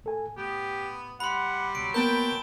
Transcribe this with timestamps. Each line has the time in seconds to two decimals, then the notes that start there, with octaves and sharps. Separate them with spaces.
0.04 A2 A4 G#5
0.37 A2 B3 G4
1.20 G3 F#5 B5 C6
1.75 C#2 B2 F#3 D7
1.94 A#3 B3 A#4 G5 A5 B5 G6